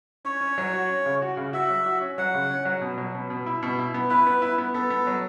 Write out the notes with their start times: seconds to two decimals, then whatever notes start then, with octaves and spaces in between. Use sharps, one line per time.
0.25 C#4 C#5
0.41 C#4
0.58 F#3
0.73 F#4
0.89 C#4
1.06 C#3
1.22 F#4
1.37 C#3
1.53 F#4 E5
1.70 F#3
1.86 F#4
2.01 C#4
2.18 F#3 F#5
2.34 C#3
2.50 C#4
2.65 F#3
2.81 B2
2.98 F#3
3.14 B2
3.30 B2
3.46 E4
3.62 B2
3.79 E4
3.94 B3
4.10 E4 B4
4.27 B3
4.42 E4
4.58 B3
4.74 B3 A4
4.90 B3
5.07 F#3